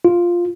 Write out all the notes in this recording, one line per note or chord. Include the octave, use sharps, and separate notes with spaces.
F4